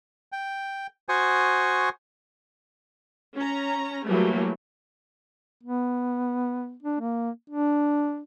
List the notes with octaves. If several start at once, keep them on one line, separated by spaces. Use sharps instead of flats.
G5
F#4 C5 G#5 C#6 D#6
C#4 A#5
E3 F#3 G3 A3 A#3
B3
D4
A#3
D4